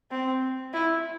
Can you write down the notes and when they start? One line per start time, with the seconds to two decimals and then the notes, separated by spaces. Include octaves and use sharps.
0.11 C4
0.73 E4